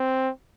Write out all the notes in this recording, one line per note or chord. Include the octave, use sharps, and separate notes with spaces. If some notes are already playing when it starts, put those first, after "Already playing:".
Already playing: C4